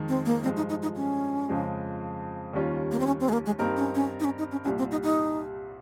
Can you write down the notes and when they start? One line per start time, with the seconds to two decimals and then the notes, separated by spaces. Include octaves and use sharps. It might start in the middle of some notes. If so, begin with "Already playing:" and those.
Already playing: F2 D#3 G#3
0.09 C4
0.26 A#3
0.43 G2 F3 G#3 C4
0.57 D#4
0.69 D#4
0.82 D#4
0.96 C#4
1.49 F2 C#3 F3 G#3
2.53 D#2 D#3 G3 C#4 F4
2.91 A#3
2.99 C4
3.07 C#4
3.20 C4
3.29 G#3
3.33 A#3
3.46 G#3
3.59 G2 G3 A#3 C4 D#4 A#4
3.77 C#4
3.95 C#4
4.20 D#4
4.24 C#4
4.38 D#4
4.51 C#4
4.64 C2 A#2 G3 C#4
4.78 C4
4.91 D#4
5.04 D#4